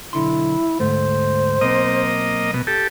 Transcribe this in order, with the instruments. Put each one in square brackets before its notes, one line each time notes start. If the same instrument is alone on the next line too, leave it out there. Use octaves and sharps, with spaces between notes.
[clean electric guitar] B1 D3 C6 [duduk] E4
[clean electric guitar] D2 G#2 A3 [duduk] C5
[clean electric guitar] B1 C4 [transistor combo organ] A#3 D#5
[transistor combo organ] B2
G4 A4